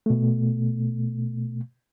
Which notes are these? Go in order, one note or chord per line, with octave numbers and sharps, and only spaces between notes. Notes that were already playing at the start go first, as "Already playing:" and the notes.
B2 A3